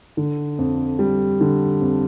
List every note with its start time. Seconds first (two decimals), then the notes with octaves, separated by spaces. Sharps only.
0.17 D3
0.58 F2
0.99 G3
1.41 D3
1.81 F2